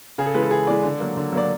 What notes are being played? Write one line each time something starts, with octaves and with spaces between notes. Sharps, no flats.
C#3 G#4
A4
E3 G#3 B4
A4
C#3 G#4
E3 G#3 D5
D3
F#3 A#3
D3
F#3 A#3 D5